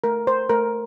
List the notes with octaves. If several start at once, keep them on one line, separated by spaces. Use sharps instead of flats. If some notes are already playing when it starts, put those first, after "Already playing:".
A3 A#4
C5
A3 A#4